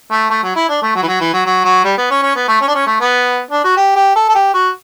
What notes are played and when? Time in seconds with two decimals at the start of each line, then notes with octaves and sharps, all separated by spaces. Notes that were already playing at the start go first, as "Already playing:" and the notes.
0.11 A3
0.30 A3
0.43 F#3
0.56 E4
0.69 D4
0.82 A3
0.95 F#3
1.03 E3
1.07 F#3
1.21 E3
1.33 F#3
1.46 F#3
1.65 F#3
1.84 G3
1.98 B3
2.10 C#4
2.22 C#4
2.35 B3
2.48 A3
2.61 C#4
2.68 D4
2.75 C#4
2.87 A3
3.00 B3
3.51 D4
3.64 F#4
3.77 G4
3.96 G4
4.16 A4
4.29 A4
4.35 G4
4.54 F#4